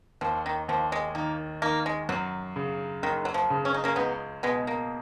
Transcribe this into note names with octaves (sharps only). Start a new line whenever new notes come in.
D#2 F3
D#3
D#2 F3
G#3
D#3 A#3
D#3 A#3
G#3
F#2 F#3
C#3
F#1 D#3
F#3
F3
C#3
C#4
D#4
A#3 C#4
C#2 B3 D#4
B2 G#3 B3
A#3